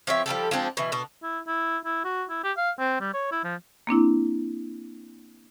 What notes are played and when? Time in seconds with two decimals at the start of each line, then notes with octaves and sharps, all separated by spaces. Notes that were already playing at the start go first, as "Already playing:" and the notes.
0.07 F3 C4 C#5 E5
0.26 F3 G3 G4 A4
0.51 F3 G#3 C4 D4
0.77 B2 E3
0.92 B2 D4
1.23 E4
1.48 E4
1.85 E4
2.04 F#4
2.30 E4
2.44 G4
2.57 F5
2.79 C4
3.01 G3
3.14 C#5
3.32 E4
3.44 F3
3.87 A#3 C4 D4 E4